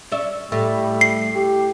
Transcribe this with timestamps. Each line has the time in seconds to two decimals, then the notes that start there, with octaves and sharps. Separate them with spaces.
0.11 C#4 D5 E5
0.52 A2 G3 A3
1.01 C7
1.36 G4